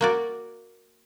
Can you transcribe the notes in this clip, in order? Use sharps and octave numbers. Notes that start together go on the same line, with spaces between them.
A#3 F#4 D5